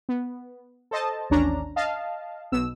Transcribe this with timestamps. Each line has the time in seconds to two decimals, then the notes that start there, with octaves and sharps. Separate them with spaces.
0.09 B3
0.91 A4 C5 D#5 A5
1.30 A1 D#2 C#4 D4 A#5
1.76 D#5 F5 A5
2.52 B1 B2 E6